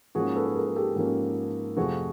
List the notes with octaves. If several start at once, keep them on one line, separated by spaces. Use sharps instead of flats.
G#2 F3 A#3 C#4 F#4 G#4
A4 B4
B4
G#4 A#4
A#4
G4 A4
G#2 F3 A#3 C#4
F2 C3 F3 A3 C4 F#4 G#4